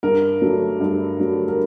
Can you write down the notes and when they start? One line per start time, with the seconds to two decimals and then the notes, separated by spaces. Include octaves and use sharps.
0.03 G2 A#4
0.42 D3 F#3 A3
0.80 G2
1.19 D3 F#3 A3
1.48 A#4